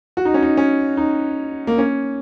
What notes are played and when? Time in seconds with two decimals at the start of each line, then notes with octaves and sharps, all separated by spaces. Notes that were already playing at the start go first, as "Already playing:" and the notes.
0.17 F#4
0.25 D#4
0.34 C#4
0.42 D#4
0.57 C#4
0.97 D#4
1.67 A#3
1.78 C#4